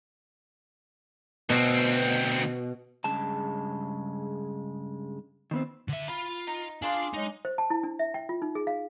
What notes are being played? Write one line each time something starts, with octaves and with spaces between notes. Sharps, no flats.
D2 B2 C4
G2 C#3 G#3 A5
D#3 B3 C4
D3 E5
F4 B5
D#4
D4 F4 G#4 F5 C6 D6
F#3 G#3 D#4
C5
A5
E4
D4
E5
G5
F4
D#4
G#4
F5